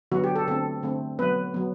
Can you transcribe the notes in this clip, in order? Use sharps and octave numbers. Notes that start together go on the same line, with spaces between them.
D3 F#3 B3 F#4
G4
A4
D3 A3 C4 A4
D3 A3 C4
F#3 B3 B4
F#3 B3